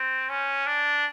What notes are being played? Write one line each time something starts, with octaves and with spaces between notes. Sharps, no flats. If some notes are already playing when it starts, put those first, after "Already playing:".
Already playing: C4
C#4
D4